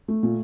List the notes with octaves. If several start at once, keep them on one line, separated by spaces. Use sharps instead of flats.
A3
A#2